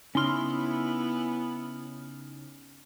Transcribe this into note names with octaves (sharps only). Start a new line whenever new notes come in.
C#3 B3 C#4 D#4 E4 C6 F6